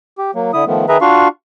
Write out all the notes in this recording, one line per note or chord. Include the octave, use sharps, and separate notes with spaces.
G4
F#3 A#3
D3 E4 D#6
D#3 F3 A3 B3
D#3 G#4 B4 E5 A#5
D4 F4 F#4 F5 C#6